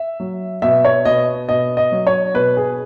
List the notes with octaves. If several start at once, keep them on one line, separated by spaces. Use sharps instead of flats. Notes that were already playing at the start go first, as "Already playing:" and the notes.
Already playing: E5
F#3
B2 E5
C#5
B2 D#5
B2 D#5
D#5
F#3
C#5
B2 B4
G#4